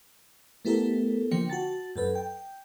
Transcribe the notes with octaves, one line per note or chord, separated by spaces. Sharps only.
A3 B3 E4 G4 A4 A#4
D3 F3 A#3 C5 G5 C#7
F#4 A5 A6
F#2 A4 B4
G5